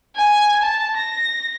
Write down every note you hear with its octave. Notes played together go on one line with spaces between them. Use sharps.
G#5
A5
A#6